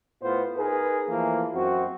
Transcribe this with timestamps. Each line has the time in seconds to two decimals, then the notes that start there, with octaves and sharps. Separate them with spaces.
0.22 A2 B3 F4 C5
0.56 D#4 G#4 A#4 B4
1.09 E3 F3 A3 A#3
1.54 F#2 C4 F#4